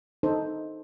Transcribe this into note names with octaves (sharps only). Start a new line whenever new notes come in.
D#4 A4 C5